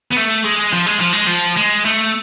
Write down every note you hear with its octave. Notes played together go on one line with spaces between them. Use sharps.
B3
A3
G#3
F3
G#3
F3
G#3
F3
G#3
A3